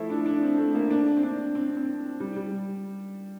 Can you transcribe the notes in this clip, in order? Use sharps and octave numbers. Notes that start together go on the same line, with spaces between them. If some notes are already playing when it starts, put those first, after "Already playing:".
Already playing: F3 A3 E4
D4
D4
C4
A3
A#3
D4
C4
D4
C4
C4
G3
G3